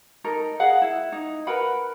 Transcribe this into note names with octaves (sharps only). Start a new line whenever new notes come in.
D#4 A4 A#4
G#4 F5 F#5
E4
D#4
A#4 B4 F#5 B5